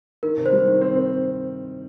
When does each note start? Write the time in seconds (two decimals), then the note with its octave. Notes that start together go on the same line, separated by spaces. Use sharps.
0.23 D#3 A#4
0.37 C3
0.46 C5
0.52 G3
0.67 D#3
0.81 C4
0.96 C4